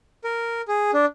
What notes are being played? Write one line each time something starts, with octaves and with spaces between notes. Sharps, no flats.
A#4
G#4
D4